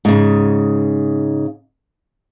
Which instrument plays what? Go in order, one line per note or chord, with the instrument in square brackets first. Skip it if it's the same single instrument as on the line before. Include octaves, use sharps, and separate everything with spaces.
[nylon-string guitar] G#2 C#3